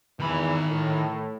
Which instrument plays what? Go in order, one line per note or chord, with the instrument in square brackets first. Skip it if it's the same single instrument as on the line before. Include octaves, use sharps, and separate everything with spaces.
[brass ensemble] E2 E3 [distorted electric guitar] D#3 B5
[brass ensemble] A2